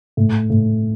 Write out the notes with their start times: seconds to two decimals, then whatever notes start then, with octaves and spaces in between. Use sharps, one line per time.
0.17 A2
0.50 A2